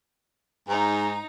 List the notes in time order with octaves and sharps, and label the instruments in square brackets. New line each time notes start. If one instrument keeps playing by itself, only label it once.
[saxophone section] G#2 [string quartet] D#4 A#5